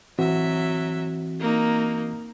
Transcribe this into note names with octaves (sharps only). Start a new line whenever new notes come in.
E3 F#3 C4 F#4 E5
A#3 D#4